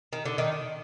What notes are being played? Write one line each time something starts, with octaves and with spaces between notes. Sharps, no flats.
D#3
D3
D#3